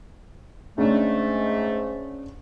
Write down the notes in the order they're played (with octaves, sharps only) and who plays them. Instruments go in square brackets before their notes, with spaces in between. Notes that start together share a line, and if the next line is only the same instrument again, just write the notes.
[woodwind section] G#2 A3 [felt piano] C#3 D4